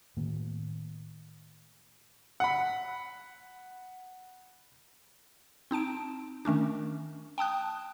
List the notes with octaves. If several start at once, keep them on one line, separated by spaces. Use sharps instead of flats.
A2 D#3 A#3
F#5 B5
C4 D#4 A5 D7
D#3 A3 C#4 D4
G5 A5 D#6 F#6